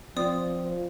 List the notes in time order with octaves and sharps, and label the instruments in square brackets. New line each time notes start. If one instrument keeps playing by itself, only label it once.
[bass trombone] F3 [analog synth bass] C4 [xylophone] D5 D#6